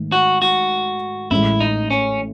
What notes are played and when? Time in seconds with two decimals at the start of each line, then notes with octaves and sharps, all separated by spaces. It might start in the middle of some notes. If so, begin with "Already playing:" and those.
Already playing: G#2 D#3 A3
0.12 F#4
0.42 F#4
1.30 A1 A2 G#3 E4
1.60 D#4
1.91 C#4